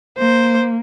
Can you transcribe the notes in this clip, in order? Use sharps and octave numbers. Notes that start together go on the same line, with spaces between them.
A#3 C5